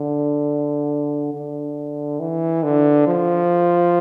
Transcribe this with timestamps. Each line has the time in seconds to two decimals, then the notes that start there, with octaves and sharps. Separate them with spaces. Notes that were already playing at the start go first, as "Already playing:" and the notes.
Already playing: D3
1.33 D3
2.20 E3
2.63 D3
3.07 F3